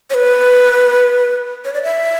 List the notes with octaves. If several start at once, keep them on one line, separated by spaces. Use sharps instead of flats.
C#5
B4
C#5
D5
E5